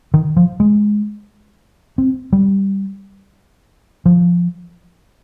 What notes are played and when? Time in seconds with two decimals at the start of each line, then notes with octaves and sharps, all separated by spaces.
0.14 D#3
0.37 F3
0.60 G#3
1.98 C4
2.33 G3
4.06 F3